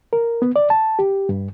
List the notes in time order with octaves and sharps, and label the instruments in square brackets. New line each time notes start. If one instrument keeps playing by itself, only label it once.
[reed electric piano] A#4
B3
D5
A5
G4
G2